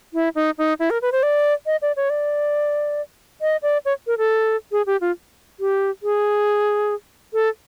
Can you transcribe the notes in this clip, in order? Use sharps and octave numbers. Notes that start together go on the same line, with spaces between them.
E4
D#4
D#4
E4
A#4
B4
C5
D5
D#5
D5
C#5
D5
D#5
D5
C#5
A#4
A4
G#4
G4
F4
G4
G#4
A4